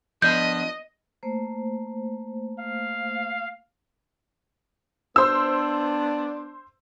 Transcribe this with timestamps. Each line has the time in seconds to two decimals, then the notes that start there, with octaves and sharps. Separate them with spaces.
0.22 F3 B3 D4 D#5 G6
1.23 A3 A#3 C5
2.59 F5
5.16 B3 D4 C5 E6